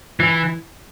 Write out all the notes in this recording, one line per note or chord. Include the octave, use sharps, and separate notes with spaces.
E3